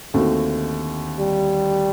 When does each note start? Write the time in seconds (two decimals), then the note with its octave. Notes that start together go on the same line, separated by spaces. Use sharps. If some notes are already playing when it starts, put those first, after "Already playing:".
0.14 D#2 D3 A3 C4 F#4
1.20 G3